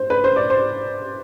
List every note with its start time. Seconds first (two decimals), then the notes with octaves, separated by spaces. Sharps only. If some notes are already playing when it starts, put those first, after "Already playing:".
Already playing: C5
0.10 B4
0.24 C5
0.36 D5
0.50 C5